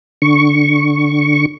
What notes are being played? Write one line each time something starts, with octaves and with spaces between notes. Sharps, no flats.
D3 C#6